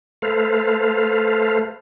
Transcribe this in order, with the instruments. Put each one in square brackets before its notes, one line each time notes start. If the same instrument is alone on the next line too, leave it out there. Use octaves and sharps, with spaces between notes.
[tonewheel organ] A3 A4 B4 C5 F5